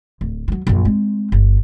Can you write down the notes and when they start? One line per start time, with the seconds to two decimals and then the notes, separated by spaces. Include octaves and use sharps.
0.21 D1
0.48 E3 F#3
0.67 A#1 F#2
0.85 G#3 C4
1.32 G1